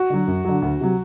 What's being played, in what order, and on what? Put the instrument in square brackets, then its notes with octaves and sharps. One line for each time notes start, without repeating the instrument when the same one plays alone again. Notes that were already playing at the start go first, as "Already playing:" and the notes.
Already playing: [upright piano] F#4
[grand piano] D3 F#3
F#2
D3 F#3
D2
C3 F#3